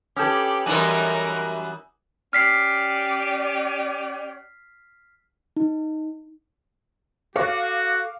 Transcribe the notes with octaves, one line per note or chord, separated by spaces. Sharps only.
C#4 G4 A4 B4 D6 D#6 G6
F#2 E3 G3 D#4 A#4 G#5 F#6 F#7
C#4 G4 D5 F6 B6 C7
D#4
F#4 A4 C#5 F5 D6